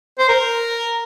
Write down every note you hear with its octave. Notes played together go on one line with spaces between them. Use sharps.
C5
A#4